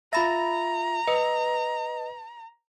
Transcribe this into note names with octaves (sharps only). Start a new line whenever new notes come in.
F4 E5 A#5 B5 A6 A#6
B4 D#5